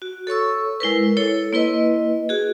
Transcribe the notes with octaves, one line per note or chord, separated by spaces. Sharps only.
F#4
A4 C#5 C#6 E6
G#3 E4 A#4 B4
E4 A4 C#5
A#3 E4 B4 D#5
F#4 G#4